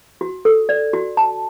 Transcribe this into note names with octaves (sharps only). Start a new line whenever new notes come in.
F#4
A4
D5
F#4
A5